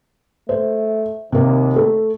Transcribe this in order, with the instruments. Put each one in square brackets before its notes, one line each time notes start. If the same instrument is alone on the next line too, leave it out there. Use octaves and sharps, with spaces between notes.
[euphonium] A3 [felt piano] C5
[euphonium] D#2 [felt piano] C3 A#3
[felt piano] A3